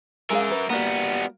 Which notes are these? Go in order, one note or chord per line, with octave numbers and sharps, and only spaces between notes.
G#3 G#4 A#4 E5 F5
B4
G3 A#3 B3 F#4